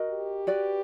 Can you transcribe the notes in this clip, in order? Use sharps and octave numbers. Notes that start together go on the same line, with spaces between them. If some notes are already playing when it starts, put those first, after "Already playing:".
Already playing: F#4 A#4 D#5
G4
F#4 B4 D5